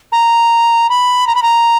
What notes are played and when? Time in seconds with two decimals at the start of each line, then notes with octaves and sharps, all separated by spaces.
0.12 A#5
0.89 B5
1.27 A#5
1.35 B5
1.42 A#5